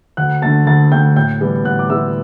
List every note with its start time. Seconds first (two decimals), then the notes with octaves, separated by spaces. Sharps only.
0.17 D2 F#5 F#6
0.42 D3 A3 A5 A6
0.66 D2 A5 A6
0.91 D3 A3 G5 G6
1.16 A2 G5 G6
1.41 E3 G3 B3 E4
1.65 A2 F#5 F#6
1.79 D6
1.89 E3 G3 B3 E4 E5 E6